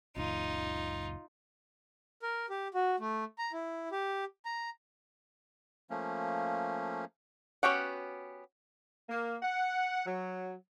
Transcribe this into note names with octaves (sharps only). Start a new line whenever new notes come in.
F#1 C#2 A#2 D#4 F4
A#4
G4
F#4
A3
A#5
E4
G4
A#5
F3 A3 A#3 C#4
B3 C#4 F#4 G4 F#5
A#3
F#5
F#3